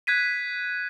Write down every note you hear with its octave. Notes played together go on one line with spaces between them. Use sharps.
F#6 G#6 B6 D#7